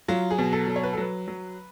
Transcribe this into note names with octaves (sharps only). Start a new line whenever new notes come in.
F#3 F4
G#4
B2
A4
F#3
C#5
B4
A4
F#3 B4
F#3